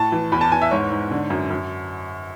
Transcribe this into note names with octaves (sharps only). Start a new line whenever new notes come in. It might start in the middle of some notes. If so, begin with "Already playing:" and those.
Already playing: A2 A5
E3
E2 B5
A5
E2 G#5
E5
G#2 C#5
G#2
D3
F#2
F#2